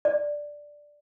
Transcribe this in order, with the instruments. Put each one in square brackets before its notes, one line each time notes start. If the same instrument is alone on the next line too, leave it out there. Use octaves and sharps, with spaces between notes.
[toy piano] D5